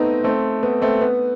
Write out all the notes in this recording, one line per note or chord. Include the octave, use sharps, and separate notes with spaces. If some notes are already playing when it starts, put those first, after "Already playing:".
Already playing: A3 B3 C4 D#4
A3 C4
B3
A3 C4
B3